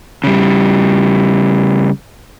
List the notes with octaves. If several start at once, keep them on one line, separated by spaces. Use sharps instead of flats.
C#3 G3